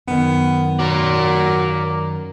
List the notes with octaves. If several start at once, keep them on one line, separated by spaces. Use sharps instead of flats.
F#2 D#3 B3
F#3 A#4 D5